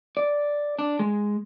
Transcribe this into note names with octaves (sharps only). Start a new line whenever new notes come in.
D5
D4
G#3